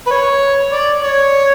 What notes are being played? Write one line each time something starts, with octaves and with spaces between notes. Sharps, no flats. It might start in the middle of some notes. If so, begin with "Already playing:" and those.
B4
C#5
D5
C#5